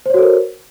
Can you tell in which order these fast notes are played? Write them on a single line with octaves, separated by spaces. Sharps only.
C5 C#5 F#4 A4 A#4